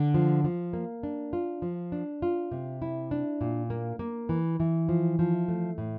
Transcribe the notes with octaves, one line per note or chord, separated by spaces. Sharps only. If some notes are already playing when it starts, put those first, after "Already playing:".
Already playing: D3
F3
F3
A#3
D4
F4
F3
D4
F4
C3
E4
D4
A#2
A#3
A#3
E3
E3
F3
F3
A3
A2